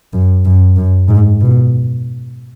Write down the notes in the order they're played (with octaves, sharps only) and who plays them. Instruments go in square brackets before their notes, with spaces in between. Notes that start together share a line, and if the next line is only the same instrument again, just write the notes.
[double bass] F#2
F#2
F#2
G#2
B2